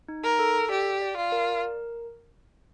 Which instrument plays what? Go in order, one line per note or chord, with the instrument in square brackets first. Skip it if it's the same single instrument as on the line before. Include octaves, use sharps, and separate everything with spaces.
[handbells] D#4
[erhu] A#4
[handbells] A4
[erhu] G4 [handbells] D5
[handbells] D5
[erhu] F4
[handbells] A#4